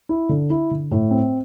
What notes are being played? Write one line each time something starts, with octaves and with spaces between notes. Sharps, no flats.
E4
D3
E4
D3
A2
C4